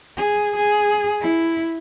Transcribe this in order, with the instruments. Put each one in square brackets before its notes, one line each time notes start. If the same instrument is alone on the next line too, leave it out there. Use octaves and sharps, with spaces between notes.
[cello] G#4
G#4
E4